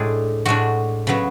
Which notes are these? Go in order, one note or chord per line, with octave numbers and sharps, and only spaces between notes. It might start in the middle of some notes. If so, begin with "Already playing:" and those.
Already playing: A2 G#3 D4 G#4
A2 G#3 D4 F#4
C#3 F#3 B3